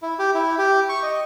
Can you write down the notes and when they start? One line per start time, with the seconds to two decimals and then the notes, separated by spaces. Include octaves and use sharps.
0.02 E4
0.19 G4
0.35 E4
0.58 G4
0.89 C#6
1.03 D#5